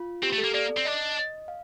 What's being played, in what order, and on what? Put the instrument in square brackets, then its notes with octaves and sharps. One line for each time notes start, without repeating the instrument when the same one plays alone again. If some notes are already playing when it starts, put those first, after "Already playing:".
Already playing: [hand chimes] F4
[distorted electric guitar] C4 [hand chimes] G4
[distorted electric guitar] A3
[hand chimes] A4
[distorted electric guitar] A#3
[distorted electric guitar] A#3 [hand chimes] D5
[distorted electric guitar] C4
[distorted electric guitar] D4 [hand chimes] D#5
[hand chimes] F5